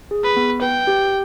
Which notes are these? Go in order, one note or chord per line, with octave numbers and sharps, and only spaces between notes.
G#4
B4
B3
B4 G5
G4